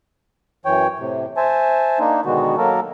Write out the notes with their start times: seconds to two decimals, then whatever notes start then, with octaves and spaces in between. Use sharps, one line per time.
0.65 F#2 E3 C#5 G5
0.99 A2 C3
1.37 C5 E5 G#5 A5
1.99 A#3 D4 D#4
2.25 B2 D3 D#3 G#3 B3 F#4
2.57 F#3 A#3 A4 A#4